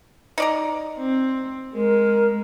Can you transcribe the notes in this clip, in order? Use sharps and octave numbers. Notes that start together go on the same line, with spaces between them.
D#4 D5 A#5
C4
G#3 A#4